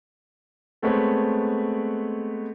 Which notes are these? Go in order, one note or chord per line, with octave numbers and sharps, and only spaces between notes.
G#3 A3 B3 C4 B4 C#5